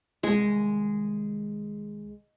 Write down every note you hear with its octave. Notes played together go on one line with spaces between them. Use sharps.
C2 D#3 G#3 G#4